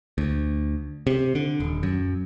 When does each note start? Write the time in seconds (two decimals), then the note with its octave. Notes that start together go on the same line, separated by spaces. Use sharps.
0.18 D2
1.07 C3
1.35 D3
1.60 D#1
1.83 F#2